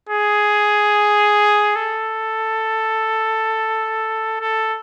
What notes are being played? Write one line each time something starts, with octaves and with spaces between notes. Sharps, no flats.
G#4
A4
A4